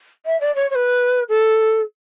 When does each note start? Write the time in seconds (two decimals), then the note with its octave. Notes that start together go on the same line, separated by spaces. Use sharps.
0.25 E5
0.40 D5
0.55 C#5
0.70 C#5
0.75 B4
1.28 A4